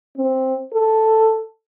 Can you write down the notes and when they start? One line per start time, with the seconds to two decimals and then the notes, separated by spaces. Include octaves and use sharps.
0.17 C4
0.74 A4